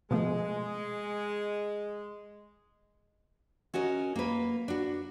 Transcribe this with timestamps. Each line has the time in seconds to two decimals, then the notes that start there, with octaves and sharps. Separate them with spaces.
0.11 B2 F3 G#3 A3
3.74 C#4 F#4 A#4 D#5
4.16 A#3 B4
4.68 D4 F#4